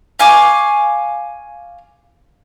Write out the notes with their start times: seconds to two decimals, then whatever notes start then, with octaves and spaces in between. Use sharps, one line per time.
0.19 F5 G#5 C#6 D6